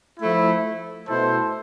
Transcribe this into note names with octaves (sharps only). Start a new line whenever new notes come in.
F3 A3 E4
B2 A3 E4 A4 C5